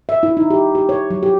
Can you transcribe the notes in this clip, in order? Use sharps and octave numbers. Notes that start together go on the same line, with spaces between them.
E5
E4
D#4
G4
G4
C#5
F#3
G4